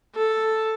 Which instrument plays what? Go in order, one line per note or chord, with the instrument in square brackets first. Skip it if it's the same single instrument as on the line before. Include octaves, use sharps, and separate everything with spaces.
[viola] A4